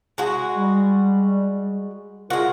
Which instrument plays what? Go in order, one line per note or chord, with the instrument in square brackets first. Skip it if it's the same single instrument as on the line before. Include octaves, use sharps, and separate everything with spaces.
[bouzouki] G#3 F#4
[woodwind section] G3
[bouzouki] G#3 F#4 [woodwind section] F4 A#4